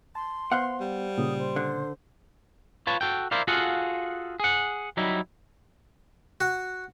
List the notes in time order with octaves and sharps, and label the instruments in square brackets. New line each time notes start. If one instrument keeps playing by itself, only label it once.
[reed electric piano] A5 [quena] C6
[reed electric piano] B3 [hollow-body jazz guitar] C5 F5 F#5
[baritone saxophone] G3
[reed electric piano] A#2 C#3 [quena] D#6
[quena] C5
[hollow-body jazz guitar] D3
[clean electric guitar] F4 B4 C#5 A5
F#4 A4 G5
E4 A#4 C5 D5 F5
F4 F#4 G#4 A4 F5 F#5
G#4 F#5
F#3 G3 D#4 E4
[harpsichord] F#4